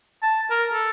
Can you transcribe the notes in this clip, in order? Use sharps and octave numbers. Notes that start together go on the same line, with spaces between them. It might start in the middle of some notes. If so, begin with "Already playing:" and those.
A5
A#4
A4